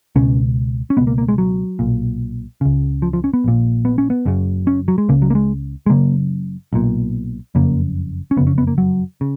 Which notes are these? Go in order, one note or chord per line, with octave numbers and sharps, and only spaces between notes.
C#2 B2 C#4
C#4
C#2 B2 B3
A#3
A#3
G#3
F#3
B1 A#2
C#2 C#3
F3
F3
C#4
B3
A#1 A#2
B3
C#4
B3
F#1 F#2 C#3
C#4
F#3
G#3
C#2 C#3 A#3
F#3
A#3
G#3
G#3
F#1 F#2 C#3 A#3
B1 A#2
F#1 F2 C#3 A#3
C#4
F#1 F2 C#3 B3
C#4
B3
A#3
F#3
C#3